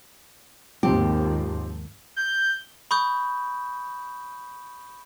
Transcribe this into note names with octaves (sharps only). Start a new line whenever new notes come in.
D#2 G#2 F3 C4 G4
G6
B5 C#6 D#6 G6